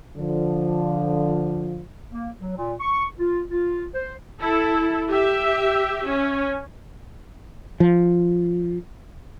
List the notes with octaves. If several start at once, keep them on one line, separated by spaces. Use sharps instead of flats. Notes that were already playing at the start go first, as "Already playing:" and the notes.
D3 F3
A#3
F#3
A#2
C#6
F4
F4
C5
E4 A4
G4 E5
C#4
F3